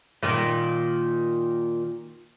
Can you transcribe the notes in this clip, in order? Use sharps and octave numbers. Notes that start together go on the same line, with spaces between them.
A#2 D#3